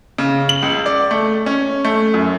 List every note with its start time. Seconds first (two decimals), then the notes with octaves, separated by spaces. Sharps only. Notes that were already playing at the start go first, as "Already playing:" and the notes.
0.18 C#3
0.49 F#7
0.63 C#2
0.86 D5
1.11 A3
1.46 C#4
1.85 A3
2.14 F#2